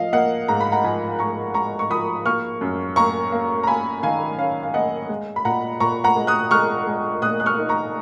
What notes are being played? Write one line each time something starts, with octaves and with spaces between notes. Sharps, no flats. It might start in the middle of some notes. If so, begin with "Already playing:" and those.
Already playing: F3 D#5 F5
A#3 D#5 F#5
G#2 A#5
B5
F#5 A#5
F3 G#5 B5
G#2 A#5 C#6
G#2 A#5 C#6
C#6
F3 B5 D#6
A#3 C#6 F6
F#2
A#3 A#5 C#6
A#3
A#5
A#3 G#5 B5
D#3 F5 G#5
C#4 F5
F5
A#3 D#5 F#5
G#3
B5
A#2 F#5 A#5
A#2 A#5 C#6
F#5 A#5
G#3
D#6 F#6
G#3 C#6 F6
G#3
A#2 D#6 F#6
F#6
C#6 F6
D#4
A#5 C#6